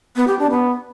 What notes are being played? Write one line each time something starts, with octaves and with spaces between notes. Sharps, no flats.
B3
G4
D4
B3